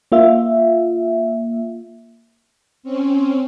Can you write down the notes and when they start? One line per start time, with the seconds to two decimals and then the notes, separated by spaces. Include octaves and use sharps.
0.12 A#3 F4 E5
2.83 C4 C#4